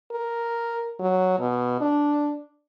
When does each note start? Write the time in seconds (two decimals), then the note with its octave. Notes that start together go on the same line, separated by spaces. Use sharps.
0.11 A#4
1.00 F#3
1.39 B2
1.81 D4